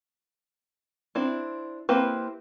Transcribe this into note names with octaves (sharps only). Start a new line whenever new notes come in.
C4 D4 E4
A#3 C4 E4 G4 B4